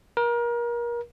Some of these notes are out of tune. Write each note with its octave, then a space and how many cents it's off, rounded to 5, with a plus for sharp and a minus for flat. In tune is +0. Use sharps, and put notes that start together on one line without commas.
A#4 +30